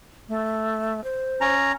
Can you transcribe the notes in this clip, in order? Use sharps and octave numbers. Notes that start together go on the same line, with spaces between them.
A3
C5
C#4 A#5